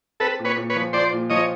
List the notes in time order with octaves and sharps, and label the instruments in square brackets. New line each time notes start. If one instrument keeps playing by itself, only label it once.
[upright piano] C4 [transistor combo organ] A4 B4
[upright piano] A#2
[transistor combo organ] B4 C#5
[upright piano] A#2
[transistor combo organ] B4 C#5
[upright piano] F3
[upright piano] F3 [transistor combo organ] C5 D5
[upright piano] A#2
[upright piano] F3 [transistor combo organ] C#5 D#5